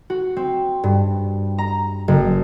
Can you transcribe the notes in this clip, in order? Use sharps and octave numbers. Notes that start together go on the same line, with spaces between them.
F#4
C4
G2
A#5
F#1